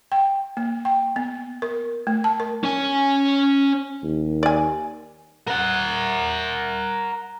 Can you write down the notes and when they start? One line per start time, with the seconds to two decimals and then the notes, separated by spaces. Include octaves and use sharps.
0.12 G5
0.57 A#3
0.85 G5
1.16 B3
1.62 A#4
2.07 A3
2.24 A5
2.40 A#4
2.64 C#4 G#5
4.03 D#2
4.43 D5 G#5
5.47 A#4 F#5